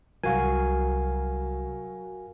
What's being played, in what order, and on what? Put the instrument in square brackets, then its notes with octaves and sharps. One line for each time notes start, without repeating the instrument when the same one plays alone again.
[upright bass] C2 [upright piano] F#3 [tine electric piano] F#4 G#5 [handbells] A#4 F5